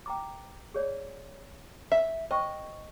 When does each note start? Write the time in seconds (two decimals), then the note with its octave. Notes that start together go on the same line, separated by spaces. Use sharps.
0.06 G5 A#5 D6
0.74 G#4 C#5 D5
1.92 E5
2.31 C5 D#5 G5 C#6